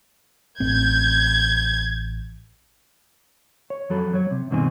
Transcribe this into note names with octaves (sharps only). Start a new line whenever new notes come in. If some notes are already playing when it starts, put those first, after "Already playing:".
A1 C4 G6 G#6
C#5
F2 F#3 A4 B5
F#3 C#5
C3
G2 B2 D#3 C4 G#5